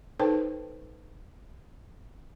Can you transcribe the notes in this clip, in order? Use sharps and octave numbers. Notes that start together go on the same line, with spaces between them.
D#4 A4 B4 C5 G5 A5